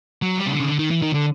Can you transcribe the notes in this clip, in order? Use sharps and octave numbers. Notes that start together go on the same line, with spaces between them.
F#3
G3
C#3
D3
C#3
D3
D#3
E3
D#3
D3